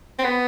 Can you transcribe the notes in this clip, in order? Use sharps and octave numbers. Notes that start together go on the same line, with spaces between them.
C4
B3 B4